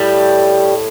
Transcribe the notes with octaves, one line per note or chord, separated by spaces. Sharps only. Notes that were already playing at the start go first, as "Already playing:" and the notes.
Already playing: A2 G3 A3 G4